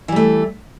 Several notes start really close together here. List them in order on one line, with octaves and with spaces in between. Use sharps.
E3 G3 A3